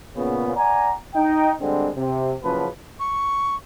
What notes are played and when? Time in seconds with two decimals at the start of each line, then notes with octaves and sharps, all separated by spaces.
0.16 A#2 C#3 B3
0.56 D5 F#5 G#5 A#5
1.15 D#4 G5
1.61 D3 G3 G#3 C4 D4
1.96 C3
2.42 F#1 C#3 F3 F#3 B4 A5
3.00 C#6